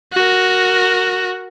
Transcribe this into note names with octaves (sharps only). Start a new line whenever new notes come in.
F#4 A#4